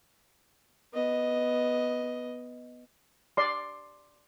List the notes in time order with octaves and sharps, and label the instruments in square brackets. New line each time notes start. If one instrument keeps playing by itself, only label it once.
[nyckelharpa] B3 D#5
[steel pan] D5 C6